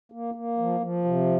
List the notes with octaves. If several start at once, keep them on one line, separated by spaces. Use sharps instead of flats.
A#3
A#3
F3
F3
C3